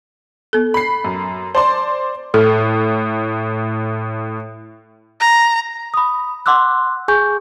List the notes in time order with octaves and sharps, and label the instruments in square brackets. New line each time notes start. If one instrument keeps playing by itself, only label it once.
[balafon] B3 A4
[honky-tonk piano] B5 C7
F#2
[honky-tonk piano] C5 D5 C6 [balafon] A5
[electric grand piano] A2 [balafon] A4
[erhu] A#5
[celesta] B5 D#6
F#5 C6 D6 E6 F#6
G#4 G#5 C#6 G6